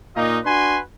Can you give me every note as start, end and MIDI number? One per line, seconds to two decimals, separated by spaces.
0.16 0.38 46
0.16 0.38 58
0.16 0.38 63
0.16 0.38 65
0.16 0.38 75
0.45 0.79 62
0.45 0.79 66
0.45 0.79 71
0.45 0.79 80
0.45 0.79 84